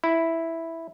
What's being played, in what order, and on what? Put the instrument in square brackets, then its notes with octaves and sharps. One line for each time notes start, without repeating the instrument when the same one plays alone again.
[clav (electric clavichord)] E4